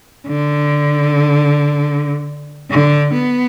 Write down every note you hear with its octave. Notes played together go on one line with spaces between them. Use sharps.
D3
D3
B3